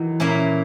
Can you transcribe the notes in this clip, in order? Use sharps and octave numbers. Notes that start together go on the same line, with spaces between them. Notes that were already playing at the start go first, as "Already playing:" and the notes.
Already playing: D#3 E3 F#3
A#2 A#3 C#4 E4